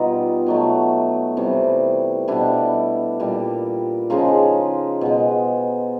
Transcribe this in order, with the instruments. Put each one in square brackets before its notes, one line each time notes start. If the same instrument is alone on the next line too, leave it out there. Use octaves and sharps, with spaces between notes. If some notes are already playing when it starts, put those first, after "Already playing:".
Already playing: [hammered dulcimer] B2 G3 D#4 F4
B2 F#3 A3
C3 E3 G3
B2 G3 D4 E4
A#2 G3
C#3 F3 G#3 D#4 F4
B2 G#3